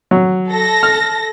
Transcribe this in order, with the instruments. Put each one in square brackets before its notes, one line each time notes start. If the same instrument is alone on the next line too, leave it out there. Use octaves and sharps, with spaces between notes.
[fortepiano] F#3
[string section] A4 A#6
[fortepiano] F6